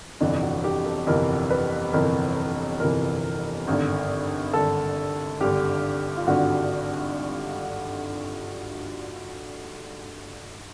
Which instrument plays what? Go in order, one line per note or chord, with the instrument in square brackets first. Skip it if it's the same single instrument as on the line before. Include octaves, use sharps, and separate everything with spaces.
[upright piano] G1 F2 C3 E3 [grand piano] D4
[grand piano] F#4
G4
A4
[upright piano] G1 F2 C3 E3 [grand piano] A#4
[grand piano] B4
[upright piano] G1 F2 C3 E3 [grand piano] A#4
[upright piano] G1 F2 C3 E3 [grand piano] A#4
[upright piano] G#1 G2 D3
[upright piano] G#1 G2 D3 [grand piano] A4
[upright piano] G#1 G2 D3 [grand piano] G4
[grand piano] F4
[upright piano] G#1 G2 D3 [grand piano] F#4